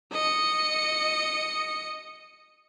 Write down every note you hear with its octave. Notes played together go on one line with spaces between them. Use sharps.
D#5 C#7